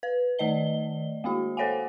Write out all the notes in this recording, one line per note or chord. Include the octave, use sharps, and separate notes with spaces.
B4
D#3 A3 D5 D#5 G7
G#3 A#3 D4 F#4
A4 C5 C#5 F5 F#5 G#5